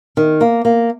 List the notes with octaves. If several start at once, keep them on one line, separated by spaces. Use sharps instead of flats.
D#3
A#3
A#3